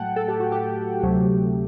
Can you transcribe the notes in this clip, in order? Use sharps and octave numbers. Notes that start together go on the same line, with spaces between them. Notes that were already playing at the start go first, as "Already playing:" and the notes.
Already playing: A2 F#3 A3 F#5 G5 A5
A4
G4
F#4
G4
D2 C3 F#3 A3